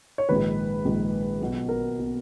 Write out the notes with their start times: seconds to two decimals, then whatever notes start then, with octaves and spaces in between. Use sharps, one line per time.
0.18 C#5
0.29 A#1 G#2 D#3 B4
0.85 A#1 G#2 D#3
1.41 B1 B2
1.69 A#4
1.99 B2